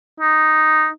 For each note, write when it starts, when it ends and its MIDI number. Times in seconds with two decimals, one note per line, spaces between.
0.20 0.88 63